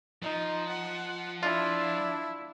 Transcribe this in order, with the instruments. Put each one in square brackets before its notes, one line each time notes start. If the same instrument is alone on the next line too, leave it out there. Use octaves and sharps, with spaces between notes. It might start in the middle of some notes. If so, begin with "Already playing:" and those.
[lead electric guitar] F3 [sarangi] D#4
[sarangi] F#5
[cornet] D4 [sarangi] E4 [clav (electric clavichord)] F4